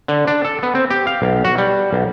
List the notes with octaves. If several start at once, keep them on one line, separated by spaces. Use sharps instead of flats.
D3
D4
A4
B3
C4
G4
F5
B1
F#4
G3
B1